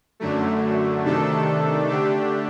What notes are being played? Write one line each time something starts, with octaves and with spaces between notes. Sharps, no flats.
F#2 D3 F#3 A3
C3 D#3 A3 D4 A4
D3 A3 D4 G4